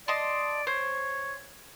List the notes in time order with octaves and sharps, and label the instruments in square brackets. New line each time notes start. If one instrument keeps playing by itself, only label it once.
[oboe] D5 [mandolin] D#5 A5 C6
[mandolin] C5 [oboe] C#5